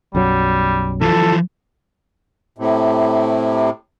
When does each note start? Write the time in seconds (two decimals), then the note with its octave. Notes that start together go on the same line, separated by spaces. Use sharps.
0.15 B1 F#2 F#3 G3
1.02 E3 F3 A4
2.58 A2 C3